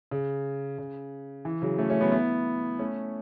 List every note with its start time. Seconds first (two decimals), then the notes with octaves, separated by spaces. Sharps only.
0.11 C#3
0.78 C#3
1.45 E3
1.62 C#3 F#3
1.78 A3 C#4
1.90 A3 C#4
2.01 F#3 B3
2.12 B3 E4
2.79 A3 C#4